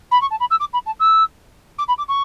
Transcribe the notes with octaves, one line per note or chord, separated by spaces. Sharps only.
B5
C#6
A5
B5
E6
D6
B5
A5
E6
D6
B5
D6
C#6